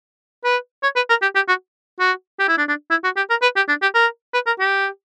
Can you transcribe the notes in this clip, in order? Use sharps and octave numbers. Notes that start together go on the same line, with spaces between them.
B4
C#5
B4
A#4
G4
G4
F#4
F#4
G4
E4
D4
D4
E4
F#4
G4
A#4
B4
G4
D4
G4
A#4
B4
A#4
G4